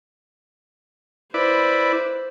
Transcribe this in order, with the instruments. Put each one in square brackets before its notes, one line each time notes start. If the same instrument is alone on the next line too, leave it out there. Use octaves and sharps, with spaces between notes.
[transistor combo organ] E4 B4 D5 [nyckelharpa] C5